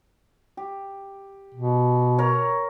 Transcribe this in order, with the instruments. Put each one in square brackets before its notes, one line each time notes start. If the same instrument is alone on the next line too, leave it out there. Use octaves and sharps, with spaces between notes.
[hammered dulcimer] G4
[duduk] B2
[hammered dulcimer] A#4 C#5